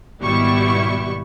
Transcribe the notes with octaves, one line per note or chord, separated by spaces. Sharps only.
G#1 B2 G3 B3 E4 C#6